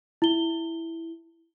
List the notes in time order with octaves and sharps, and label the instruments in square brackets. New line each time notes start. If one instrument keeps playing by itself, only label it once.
[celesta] E4 G7